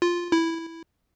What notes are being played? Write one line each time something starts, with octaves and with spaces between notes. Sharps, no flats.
F4
E4